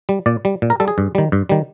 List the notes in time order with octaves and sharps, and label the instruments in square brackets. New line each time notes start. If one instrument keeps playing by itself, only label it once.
[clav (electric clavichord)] G3
A#2 D5
G3
A#2
A#4
G3 A4
G#4
G2
D#3 G3
G2
D#3 G3